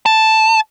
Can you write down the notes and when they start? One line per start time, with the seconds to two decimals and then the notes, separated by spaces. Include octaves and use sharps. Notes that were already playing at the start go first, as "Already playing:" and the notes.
0.06 A5